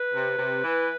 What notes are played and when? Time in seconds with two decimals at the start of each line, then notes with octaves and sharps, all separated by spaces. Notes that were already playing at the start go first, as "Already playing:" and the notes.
Already playing: B4
0.14 C3
0.38 C3
0.64 E3